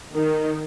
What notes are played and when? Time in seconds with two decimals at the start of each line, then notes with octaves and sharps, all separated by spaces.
0.12 D#3